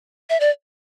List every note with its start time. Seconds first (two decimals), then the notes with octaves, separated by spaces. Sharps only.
0.30 E5
0.40 D5